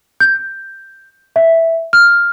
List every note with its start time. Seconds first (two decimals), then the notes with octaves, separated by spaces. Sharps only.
0.20 G6
1.36 E5
1.93 F6